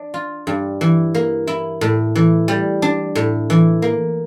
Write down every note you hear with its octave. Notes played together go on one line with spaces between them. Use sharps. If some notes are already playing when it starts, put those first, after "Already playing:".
Already playing: D4
F4
G2
E3
A#3
E4
A2
E3
G3
D4
A2
E3
A#3